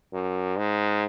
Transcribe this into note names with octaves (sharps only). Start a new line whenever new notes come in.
F#2
G#2